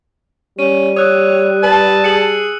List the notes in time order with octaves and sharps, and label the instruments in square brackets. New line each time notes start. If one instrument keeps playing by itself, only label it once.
[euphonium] G3 [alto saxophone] C#4 [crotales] D#7
[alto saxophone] C#5 [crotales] D#6 E6 F#6
[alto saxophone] B4 [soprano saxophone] A5
[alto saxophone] G#4 [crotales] C#7 F#7